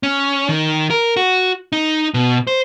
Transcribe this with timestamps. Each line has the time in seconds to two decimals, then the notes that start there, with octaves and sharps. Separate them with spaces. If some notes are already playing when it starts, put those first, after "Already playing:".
0.03 C#4
0.49 D#3
0.90 A#4
1.17 F#4
1.72 D#4
2.14 B2
2.47 C5